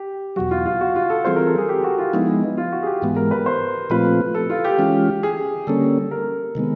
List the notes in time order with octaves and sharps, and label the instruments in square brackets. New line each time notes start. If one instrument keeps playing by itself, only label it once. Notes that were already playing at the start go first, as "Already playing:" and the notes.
Already playing: [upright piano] G4
[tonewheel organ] E2 B2 F#3 [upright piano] F#4
[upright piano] F4
F4
F#4
F4
A4
[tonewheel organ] E3 G3 C4 F4 G#4 [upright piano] C5
[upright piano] A#4
A4
G#4
G4
F#4
F4
[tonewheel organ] F3 G#3 B3 D#4 [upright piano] E4
[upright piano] F4
F#4
G#4
G4
[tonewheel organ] G#2 E3 G#3 B3
[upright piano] A#4
B4
C5
[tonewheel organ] A#2 F3 A3 C4 F4 [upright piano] B4
[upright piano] A4
F4
G4
[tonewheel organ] E3 G#3 C#4 F4
[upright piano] G#4
[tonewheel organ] D3 G3 A#3 C#4 [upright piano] A4
[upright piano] A#4
[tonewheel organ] C3 D#3 G#3 B3